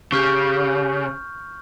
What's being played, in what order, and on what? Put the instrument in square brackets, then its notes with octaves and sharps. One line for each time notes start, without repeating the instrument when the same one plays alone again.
[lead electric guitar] C#3 [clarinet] G4 [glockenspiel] C#6 F6 G6